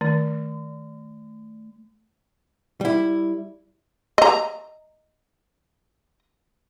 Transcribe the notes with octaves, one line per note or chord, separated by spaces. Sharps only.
D#3 A3
G3 E4
D#5 A#5